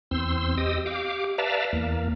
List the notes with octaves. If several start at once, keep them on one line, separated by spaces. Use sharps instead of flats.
E2 C4 C6 E6
G4 D#5 D#6 E6
G4 F5 D6
B4 D5 E5 F5 A5 A#5
E2 A#3